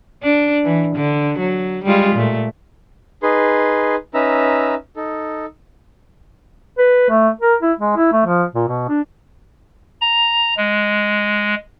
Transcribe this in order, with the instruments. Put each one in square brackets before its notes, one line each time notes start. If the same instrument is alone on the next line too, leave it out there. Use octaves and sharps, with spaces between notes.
[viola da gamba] D4
E3
D3
F#3
G3 G#3 F4
A#2 A3
[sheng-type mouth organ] D#4 G#4 B4 C6
C#4 D#4 B4 E5 A#5 E6
D#4 A4
[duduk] B4
A3
A#4
E4
G#3
E4
A3
F3
A#2
B2
D4
[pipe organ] A#5
G#3